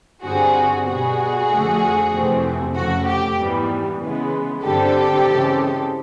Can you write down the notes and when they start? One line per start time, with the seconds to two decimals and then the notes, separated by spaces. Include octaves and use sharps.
0.24 G2 D3 G3 C4 F#4 G#4
0.86 B2 G3 B3 F#4 G#4
1.50 F2 D3 F3 A3
2.12 F2 C3 E3 A3 C4
2.75 F2 C#3 F3 A3 F#4
3.06 G4
3.38 G#2 E3 G3 B3
4.00 C#3 E3 G#3 B3
4.63 G2 D3 G3 C4 G4 A4
5.26 C#3 E3 G#3 C4